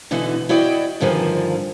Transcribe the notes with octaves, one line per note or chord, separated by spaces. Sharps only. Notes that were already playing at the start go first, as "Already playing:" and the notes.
B2 D3 E3 B3 D#4 F#4
E4 F#4 D5 D#5 G5
G2 D3 D#3 F3 G#5